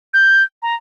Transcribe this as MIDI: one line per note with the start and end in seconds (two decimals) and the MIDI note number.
0.14 0.43 91
0.62 0.75 82